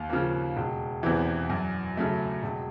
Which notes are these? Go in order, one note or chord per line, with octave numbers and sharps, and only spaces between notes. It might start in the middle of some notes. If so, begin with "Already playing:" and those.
Already playing: D#2
C#3 F3 A#3
E1
E2 C3 E3
F#2
C#3 F#3 A3
E1